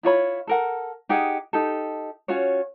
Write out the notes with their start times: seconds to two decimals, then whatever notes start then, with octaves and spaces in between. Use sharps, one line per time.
0.03 E4 F4 C#5 B5
0.47 A4 A#4 F#5
1.09 D#4 G4 G#4 F#5
1.53 D#4 G4 A4
2.28 C#4 F4 F#4 C#5